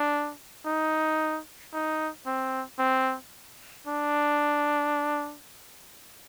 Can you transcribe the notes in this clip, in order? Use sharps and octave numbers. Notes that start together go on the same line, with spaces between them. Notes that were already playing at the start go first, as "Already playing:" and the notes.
Already playing: D4
D#4
D#4
C4
C4
D4